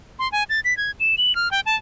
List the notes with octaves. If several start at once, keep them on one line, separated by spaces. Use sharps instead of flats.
C6
G#5
A6
B6
G#6
E7
F#7
F6
G5
A5